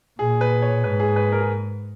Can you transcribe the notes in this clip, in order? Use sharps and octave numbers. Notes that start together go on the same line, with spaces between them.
A#2 G#4
B4
C#5
G#2 B4
G#4
B4
A#4
G#4